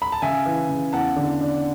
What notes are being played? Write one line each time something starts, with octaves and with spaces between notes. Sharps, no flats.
B5
A5
C#3 E5 G#5
E3
C#3
E2 F#5 A5
D3
D4